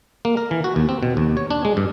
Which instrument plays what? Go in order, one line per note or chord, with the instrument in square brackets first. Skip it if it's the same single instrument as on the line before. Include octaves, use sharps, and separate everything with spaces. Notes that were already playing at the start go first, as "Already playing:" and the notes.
[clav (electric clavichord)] A#3
A#4
E3
F#4
D#2
C4
B2
D#2
C#5
D4
G#3
G2